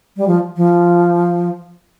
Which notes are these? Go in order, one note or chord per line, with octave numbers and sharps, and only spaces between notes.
G3
F3
F3